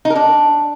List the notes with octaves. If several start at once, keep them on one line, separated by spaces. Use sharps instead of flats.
D#4
A#4
D4